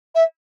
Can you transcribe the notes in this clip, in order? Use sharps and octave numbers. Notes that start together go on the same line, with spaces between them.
E5